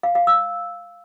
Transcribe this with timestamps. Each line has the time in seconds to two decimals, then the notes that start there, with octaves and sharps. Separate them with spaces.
0.03 F5
0.15 F5
0.27 E6